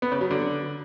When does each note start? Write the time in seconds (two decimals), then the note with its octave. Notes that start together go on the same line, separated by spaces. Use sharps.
0.02 B3
0.12 C#3
0.21 F#3
0.31 D3